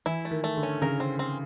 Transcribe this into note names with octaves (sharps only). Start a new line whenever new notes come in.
E3 E4
A3
D#3
A3
D3
C#4
C#3 A#4
C4
C4